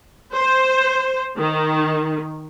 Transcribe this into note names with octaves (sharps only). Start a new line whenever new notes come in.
C5
D#3